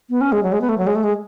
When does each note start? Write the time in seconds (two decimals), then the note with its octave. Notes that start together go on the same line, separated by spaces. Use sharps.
0.10 B3
0.21 C#4
0.32 G#3
0.43 F#3
0.52 G#3
0.61 B3
0.69 A3
0.78 F#3
0.87 G#3
0.95 A3
1.04 G#3